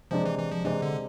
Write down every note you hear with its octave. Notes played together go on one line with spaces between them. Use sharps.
C3 F3 G#3 D4
E3
E3
F3
C3 E3 G#3 D4
D3